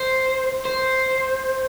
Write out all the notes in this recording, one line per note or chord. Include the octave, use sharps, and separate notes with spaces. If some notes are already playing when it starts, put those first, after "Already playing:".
Already playing: C5
C5